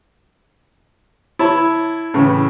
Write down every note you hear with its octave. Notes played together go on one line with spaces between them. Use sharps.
E4 C#5 A5
A2 C#3 E3